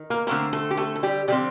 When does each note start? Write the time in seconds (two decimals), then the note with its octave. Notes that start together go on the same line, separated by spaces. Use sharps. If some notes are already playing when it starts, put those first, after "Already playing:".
Already playing: D#3
0.10 A#3 A#4
0.27 D3 A3 A#3 C4 A#4
0.53 A3 A4
0.71 G4
0.77 A3 A4
0.96 A4
1.03 G3 G4
1.28 D3 F3 G3 C4 G4